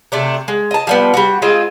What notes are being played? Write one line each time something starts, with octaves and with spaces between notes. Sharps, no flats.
C3 A3 D4
G#3
D#5 A5
F3 G3 B3
G3 F#4
G#3 C4 F4 D#5